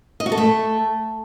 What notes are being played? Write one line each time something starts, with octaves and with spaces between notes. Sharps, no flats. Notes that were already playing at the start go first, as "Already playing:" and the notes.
D#5
F#4
A4
A3